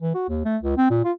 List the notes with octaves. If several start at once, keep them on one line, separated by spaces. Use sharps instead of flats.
E3
F#4
D#2
A3
C#2
C4
A#2
F4